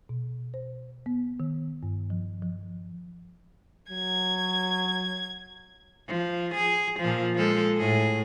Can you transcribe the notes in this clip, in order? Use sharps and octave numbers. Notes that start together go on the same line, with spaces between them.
B2
C5
B3
D#3
G2
F3
F3
F#3 G#6
F3
G#4
A#2 F3
F3 G#3 A4
A2 G#4